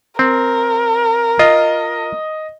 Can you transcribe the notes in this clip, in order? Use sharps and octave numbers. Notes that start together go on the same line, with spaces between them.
C4 A#4
F4 D#5